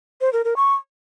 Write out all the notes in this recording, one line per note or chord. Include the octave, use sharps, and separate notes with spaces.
C5
A#4
A#4
C#6